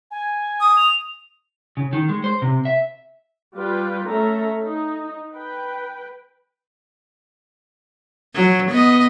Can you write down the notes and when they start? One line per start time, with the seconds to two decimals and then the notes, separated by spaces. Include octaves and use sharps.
0.11 G#5
0.60 D#6
0.77 F7
1.77 C#3
1.93 D#3
2.09 G#3
2.24 C5
2.42 C3
2.65 E5
3.56 G3 F4 B4 G5
4.09 A3 C#4 A4 E5 A#5
4.63 D#4
5.34 B4 G5
8.35 F#3
8.71 B3 D#5